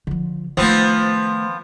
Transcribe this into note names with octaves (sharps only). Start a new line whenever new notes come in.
D3 F3
D#3 F3 A3 B3 C4